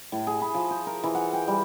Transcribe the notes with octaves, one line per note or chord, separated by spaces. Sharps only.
A2
G#4
B5
F3
C5
A#4
E3
F#5
G5
G3